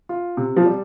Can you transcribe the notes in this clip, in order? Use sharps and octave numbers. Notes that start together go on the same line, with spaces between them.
F4
C3
F3
G3